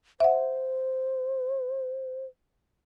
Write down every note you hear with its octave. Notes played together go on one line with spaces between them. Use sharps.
C5 E5 F#5